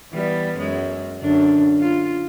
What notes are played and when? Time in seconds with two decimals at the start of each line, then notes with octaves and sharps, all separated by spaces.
0.12 E3 G3 B3
0.57 F#2 G#3
1.20 F#2 D3 D4
1.80 F4